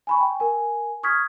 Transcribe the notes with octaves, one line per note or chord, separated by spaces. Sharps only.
G#5 B5 C#6
G5
A#4 G#5
C#6 D#6 F6 G#6 B6